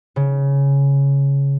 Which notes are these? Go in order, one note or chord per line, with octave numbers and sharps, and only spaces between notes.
C#3